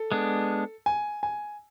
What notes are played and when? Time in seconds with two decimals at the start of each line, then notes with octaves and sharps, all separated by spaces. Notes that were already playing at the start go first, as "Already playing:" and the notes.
Already playing: A4
0.12 G#3 B3 D4
0.86 G#5
1.23 G#5